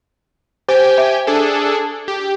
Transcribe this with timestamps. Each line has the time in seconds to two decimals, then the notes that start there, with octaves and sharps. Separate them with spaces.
0.68 G4 C5 G5 G#5
0.98 E5
1.27 D4 G#4 A4
2.08 G4